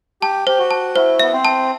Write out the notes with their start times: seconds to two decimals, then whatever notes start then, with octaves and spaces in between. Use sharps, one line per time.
0.22 G4 A5
0.47 G4 C5
0.59 F#4
0.71 A5
0.96 E4 C5
1.20 B3 E5
1.33 C4
1.45 A5